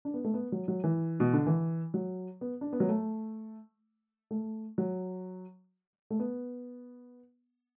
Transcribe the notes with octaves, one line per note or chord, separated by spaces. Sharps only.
D4
B3
A3
B3
F#3
F#3
E3
B2
D3
E3
F#3
B3
D4
B3
F#3
A3
A3
F#3
A3
B3